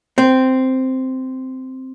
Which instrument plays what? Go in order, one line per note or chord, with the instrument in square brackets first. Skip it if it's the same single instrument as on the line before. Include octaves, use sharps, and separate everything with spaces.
[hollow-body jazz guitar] C4